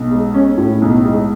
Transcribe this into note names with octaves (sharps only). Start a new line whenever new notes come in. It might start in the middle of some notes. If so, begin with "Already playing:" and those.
Already playing: B1
G#3
C#4
A2
B1
G#3